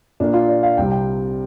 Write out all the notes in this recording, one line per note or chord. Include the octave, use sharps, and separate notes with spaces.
A#2 A#3 D4
F4
D5
F5
C2 C3 G3 C4 G5
G5